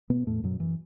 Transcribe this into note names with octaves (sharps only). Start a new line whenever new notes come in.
B2 B3
E2 A2 A3
F#2 B2 F#3
F#2 E3